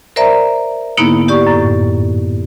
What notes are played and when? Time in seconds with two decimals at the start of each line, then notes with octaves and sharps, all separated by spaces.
0.16 A#4 C5 D5 E5 A#5
0.97 G#2 D3 A#3 B3 D#4 E4
1.28 G4 D5 C#6
1.47 F#2 A2